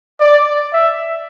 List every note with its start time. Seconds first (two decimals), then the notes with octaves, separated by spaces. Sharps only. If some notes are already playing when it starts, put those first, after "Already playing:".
0.20 D5
0.73 E5